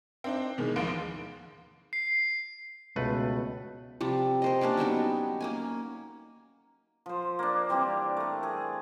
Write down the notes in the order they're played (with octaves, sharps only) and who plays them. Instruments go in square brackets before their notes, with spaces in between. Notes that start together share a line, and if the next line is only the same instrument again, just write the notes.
[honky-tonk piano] C4 D4 D#4
B2 D#3 E3 G#3
A1 D#2 G#2 F3 F5 D7
[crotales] C7
[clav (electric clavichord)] C#2 A3 B4 [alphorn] B2
[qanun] C3 F3 G3
A#4 C5 D#5
G3 A#3 C#4 D4
F#3 G3 B3 D#4
A#3 C#4 G#5
[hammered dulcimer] F3 C5
A#3 D4
E3 G3 C4 G4
A3 A#4
G#4 A4